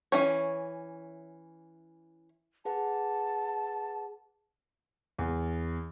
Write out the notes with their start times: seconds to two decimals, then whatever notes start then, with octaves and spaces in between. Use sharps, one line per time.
0.12 E3 C#4 C#5
2.65 G#4 B4 F#5 A5
5.18 E2